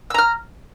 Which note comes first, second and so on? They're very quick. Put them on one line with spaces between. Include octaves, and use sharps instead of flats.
E6 A#5 F6